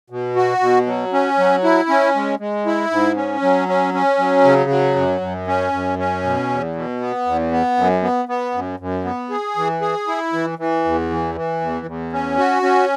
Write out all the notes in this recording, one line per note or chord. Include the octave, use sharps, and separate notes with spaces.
B2
F#4
B2
F#3
C#4
F#3
E4
C#4
G#3
G#3
E4
G#2
C#4
F#3
C#4
C#4
F#3
C#3
F#3
F#2
F#2
C#4
F#2
C#4
B2
E2
B2
B3
E2
B3
F#2
B3
B3
F#2
F#2
B3
G#4
E3
G#4
E4
E3
E3
E2
E3
E3
E2
E2
C#4
F#4
C#4